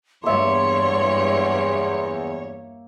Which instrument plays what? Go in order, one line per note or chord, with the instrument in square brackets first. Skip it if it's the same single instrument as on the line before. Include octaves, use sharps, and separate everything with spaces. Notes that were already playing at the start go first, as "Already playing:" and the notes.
[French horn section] E2 [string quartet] G2 C#5 [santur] A#3 E5 [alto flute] C6